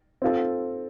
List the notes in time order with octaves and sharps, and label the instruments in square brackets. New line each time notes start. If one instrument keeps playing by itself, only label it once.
[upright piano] C4 F4 A4